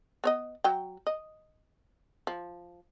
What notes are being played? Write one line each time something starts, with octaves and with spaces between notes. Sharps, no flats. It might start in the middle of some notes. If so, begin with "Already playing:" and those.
B3 C#5 D#5
F#3 G5
D#5
F3